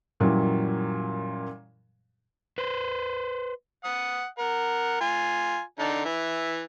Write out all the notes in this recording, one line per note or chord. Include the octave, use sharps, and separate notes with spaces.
F#2 A#2 E3 F#3 G3
B4 C5
F#5 D#6
A#4 F#5
F4 G#5
D3 D4 D#4
E3 E5